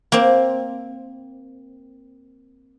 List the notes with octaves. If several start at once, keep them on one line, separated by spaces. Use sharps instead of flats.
A#3 C4